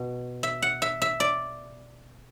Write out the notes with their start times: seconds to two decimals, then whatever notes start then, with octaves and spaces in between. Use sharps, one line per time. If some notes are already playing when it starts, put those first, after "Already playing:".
Already playing: B2
0.43 E5
0.62 F#5
0.82 E5
1.02 E5
1.20 D5